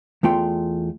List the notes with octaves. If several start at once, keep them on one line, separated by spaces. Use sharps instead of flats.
E2 A3 F4 G5 C6